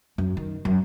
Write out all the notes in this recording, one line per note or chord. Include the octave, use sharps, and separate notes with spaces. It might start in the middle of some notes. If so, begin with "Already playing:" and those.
F#2
D#3
F#2